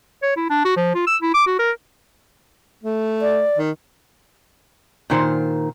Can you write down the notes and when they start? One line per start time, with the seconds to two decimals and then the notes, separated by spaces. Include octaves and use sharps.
0.23 C#5
0.37 E4
0.50 D4
0.65 F#4
0.77 F3
0.95 F4
1.07 E6
1.22 E4
1.34 D6
1.47 F#4
1.59 A#4
2.83 A3
3.22 D5
3.57 D#3
5.10 A#2 D#3 C5